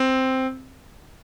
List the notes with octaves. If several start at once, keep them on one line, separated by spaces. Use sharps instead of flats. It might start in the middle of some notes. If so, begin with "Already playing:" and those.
Already playing: C4